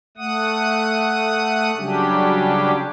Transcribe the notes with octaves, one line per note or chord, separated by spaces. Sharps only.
A3 F#5 D#6
C#3 F#3 G3 C#4 D4 G4